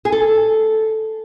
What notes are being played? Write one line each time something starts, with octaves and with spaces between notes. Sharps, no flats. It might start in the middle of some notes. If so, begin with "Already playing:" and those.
G#4
A4